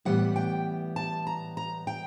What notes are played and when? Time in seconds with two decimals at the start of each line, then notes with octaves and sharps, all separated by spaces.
0.05 A2 E3 G3 B3 F#5
0.36 G5
0.96 A5
1.27 A#5
1.57 A#5
1.87 G5